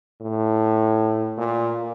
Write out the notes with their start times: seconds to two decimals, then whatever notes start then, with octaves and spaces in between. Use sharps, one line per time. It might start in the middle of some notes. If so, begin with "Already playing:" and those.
0.21 A2
1.38 A#2